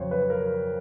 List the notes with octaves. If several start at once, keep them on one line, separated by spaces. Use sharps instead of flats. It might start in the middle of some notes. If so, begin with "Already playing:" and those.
Already playing: F2 C#3 F#3 C5 C#5
B4
A#4